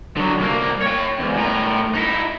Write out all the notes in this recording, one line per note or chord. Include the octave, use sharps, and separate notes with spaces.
D3 F#3
C2 A#3
C#5 G5
E2 G#2
A2 A#4
D#4 E4